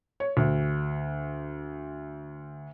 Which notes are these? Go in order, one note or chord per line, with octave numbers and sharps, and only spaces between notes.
C#5
D2